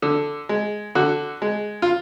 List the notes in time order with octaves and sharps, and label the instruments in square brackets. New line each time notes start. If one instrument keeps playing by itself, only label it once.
[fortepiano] D3
G#3
D3 F#4
G#3
F4